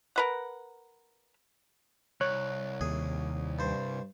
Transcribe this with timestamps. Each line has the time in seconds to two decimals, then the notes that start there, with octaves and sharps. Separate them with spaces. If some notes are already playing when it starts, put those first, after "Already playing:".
0.16 A#4 B4 F#5
2.21 C2 C#5 F#6
2.81 D#2 G#4
3.59 G2 C5